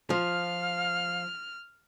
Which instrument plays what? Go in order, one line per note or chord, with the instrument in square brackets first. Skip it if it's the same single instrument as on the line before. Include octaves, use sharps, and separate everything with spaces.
[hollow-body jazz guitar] F3 [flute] F5 [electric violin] F6